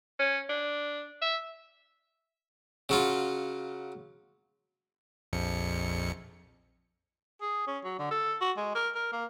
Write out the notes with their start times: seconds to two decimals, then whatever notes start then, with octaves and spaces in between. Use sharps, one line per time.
0.19 C#4
0.49 D4
1.22 E5
2.89 C#3 F#3 F4
5.33 A#1 F2 C#7
7.42 G#4
7.67 C#4
7.85 F#3
7.99 D3
8.11 A4
8.41 F#4
8.57 G#3
8.75 A#4
8.95 A#4
9.12 A#3